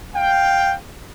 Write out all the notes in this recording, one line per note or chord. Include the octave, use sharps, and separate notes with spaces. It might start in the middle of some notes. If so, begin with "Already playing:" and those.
F5 G5